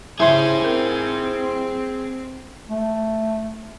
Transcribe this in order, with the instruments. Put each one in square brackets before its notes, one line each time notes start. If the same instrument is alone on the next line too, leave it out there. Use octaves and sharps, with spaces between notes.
[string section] C#3 G#5 [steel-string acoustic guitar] E4 G4 [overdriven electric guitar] G#4 C5 [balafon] E5 C6
[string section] C4 [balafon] A#4
[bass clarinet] A3